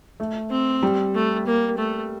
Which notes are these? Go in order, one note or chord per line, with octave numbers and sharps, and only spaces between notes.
A3
C4
G3
A3
A#3
A3